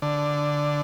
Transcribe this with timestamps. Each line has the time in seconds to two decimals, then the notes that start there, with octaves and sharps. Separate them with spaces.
0.02 D3